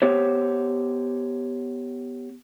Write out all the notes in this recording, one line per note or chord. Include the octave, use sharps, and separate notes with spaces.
B3 G4 C5 C#5